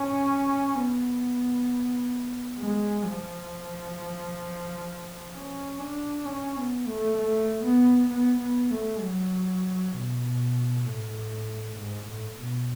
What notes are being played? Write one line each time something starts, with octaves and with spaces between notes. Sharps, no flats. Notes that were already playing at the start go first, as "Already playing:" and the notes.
Already playing: C#4
B3
G#3
F3
C#4
D4
C#4
B3
A3
A3
B3
B3
B3
A3
F#3
B2
A2
G#2
A2
B2